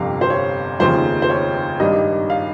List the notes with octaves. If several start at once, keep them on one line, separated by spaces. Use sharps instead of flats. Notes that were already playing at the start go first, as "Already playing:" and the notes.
Already playing: G1 F2 C3 F5
C5
C#5
F1 D#2 C#3 F3 C5
C5
C#5
G#1 G2 D#3 G3 D#5
F5